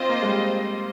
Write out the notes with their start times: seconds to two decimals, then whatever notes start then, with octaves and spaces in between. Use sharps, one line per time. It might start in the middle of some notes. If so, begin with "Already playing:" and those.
Already playing: C4 F4 C5 D#5
0.09 A#3
0.22 G#3
0.28 G3